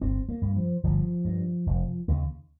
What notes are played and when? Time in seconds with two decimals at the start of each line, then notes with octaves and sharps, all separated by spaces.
0.01 G1 C4
0.29 A#3
0.42 G2
0.56 F3
0.83 G1 F3
1.25 G2
1.67 F1
2.08 D#2 C#3